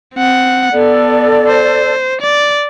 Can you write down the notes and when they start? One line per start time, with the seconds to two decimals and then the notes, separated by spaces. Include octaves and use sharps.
0.15 C4 F#5
0.73 B3 A4 D5
1.48 C5
2.21 D5